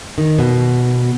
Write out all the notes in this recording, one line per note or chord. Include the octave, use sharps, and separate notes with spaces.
D#3
B2